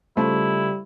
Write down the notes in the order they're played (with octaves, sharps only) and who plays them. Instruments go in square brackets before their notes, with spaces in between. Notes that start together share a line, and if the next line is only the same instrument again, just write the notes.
[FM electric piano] C#3 F4 C5 [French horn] G3 [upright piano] A3 [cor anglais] E4